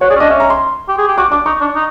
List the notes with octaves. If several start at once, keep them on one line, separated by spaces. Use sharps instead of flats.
F#4 C#5
G#4 D5
C#4
D4 D#5
C#4 E5
A#5
C6
G4
G#4
G4
F#4 D6
D4 D6
D#4 C#6
D4
D#4